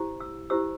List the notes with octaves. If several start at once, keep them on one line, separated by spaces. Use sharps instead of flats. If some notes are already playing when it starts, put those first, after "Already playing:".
Already playing: E4 G4 C5
E6
E4 G4 C5 E6